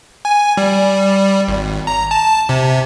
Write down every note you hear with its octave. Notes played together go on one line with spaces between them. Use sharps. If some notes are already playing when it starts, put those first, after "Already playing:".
G#5
G3
G#1
A#5
A5
C3